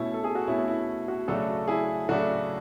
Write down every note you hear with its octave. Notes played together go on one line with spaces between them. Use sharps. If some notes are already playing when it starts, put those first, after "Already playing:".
Already playing: B2 A3 C#4 E4
A4
G#4
F#4
B2 A3 C#4 E4
E4
F#4
C#3 F#3 A3 D4 F#4 A4
E4 G#4
C#3 F#3 A3 D4 F#4